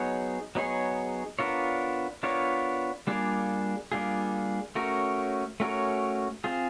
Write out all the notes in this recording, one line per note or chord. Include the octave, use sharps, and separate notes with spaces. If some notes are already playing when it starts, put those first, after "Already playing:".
Already playing: F#3 B3 D#4 G#4 C#5
F#3 B3 D#4 G#4 C#5
B3 D4 F4 A#4 C#5
B3 D4 F4 A#4 C#5
G3 A#3 D4 F4 G#4
G3 A#3 D4 F4 G#4
A3 C#4 F#4 A#4 C#5
A3 C#4 F#4 A#4 C#5
C4 F4 G#4